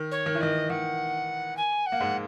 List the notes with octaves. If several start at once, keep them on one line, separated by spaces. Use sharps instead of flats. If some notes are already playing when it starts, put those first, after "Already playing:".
Already playing: D#3
C#5
D#3
E3
D#3 D#5
D#3 F#5
G#5
F#5
A#3
G#2 G#3